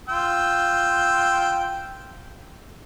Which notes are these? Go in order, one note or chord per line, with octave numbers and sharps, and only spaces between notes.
F4 G5 E6